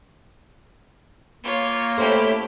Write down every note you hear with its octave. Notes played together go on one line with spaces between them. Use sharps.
A#3 F4 C#5
A3 C#4 E4 G4 C5